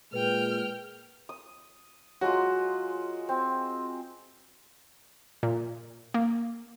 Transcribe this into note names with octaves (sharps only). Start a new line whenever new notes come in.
A#2 G#3 B4 G5 F6
D#6
F#3 G#3 F4 F#4
C4
A#2
A#3